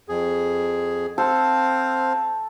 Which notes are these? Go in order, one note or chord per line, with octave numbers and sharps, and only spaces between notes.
F2 G#4
C4 A4 C5 F5